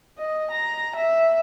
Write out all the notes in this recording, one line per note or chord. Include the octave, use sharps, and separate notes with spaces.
D#5
A#5
E5